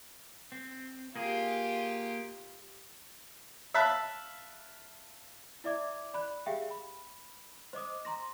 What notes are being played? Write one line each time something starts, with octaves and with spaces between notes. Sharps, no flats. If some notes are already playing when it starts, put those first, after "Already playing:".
C4
A#3 F4 G4 G#4
E5 F5 A5 B5 E6 F#6
E4 D5 E5 D6 G#6
D5 B5 F#6
G4 G#4 E5 F5 G5
B5
C5 D#5 D6 D#6
A#5 C6 A#6